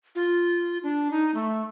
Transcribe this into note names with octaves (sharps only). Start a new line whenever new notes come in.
F4
D4
D#4
A3